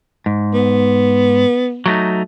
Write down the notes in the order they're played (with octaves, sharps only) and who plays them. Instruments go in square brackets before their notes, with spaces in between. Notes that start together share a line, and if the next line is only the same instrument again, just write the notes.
[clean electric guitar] G#2
[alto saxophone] B3
[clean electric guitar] F#3 A3 D#4